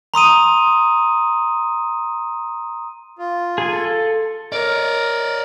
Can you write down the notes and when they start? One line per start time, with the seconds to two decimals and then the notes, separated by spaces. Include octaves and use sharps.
0.14 A#5 C6 D#6 D#7
3.19 F4
3.58 G#4 G#5
3.72 A4
4.52 A#4 C#5 D5